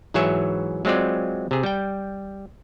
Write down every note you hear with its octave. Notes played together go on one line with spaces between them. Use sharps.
G#2 E3 F#3 G#4 C#5 E5
F#3 G#3 C4 F4 D5
C3 G#4
G3 G5